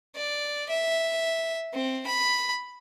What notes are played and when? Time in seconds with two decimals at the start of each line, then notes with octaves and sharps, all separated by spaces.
0.16 D5
0.70 E5
1.73 C4
2.07 B5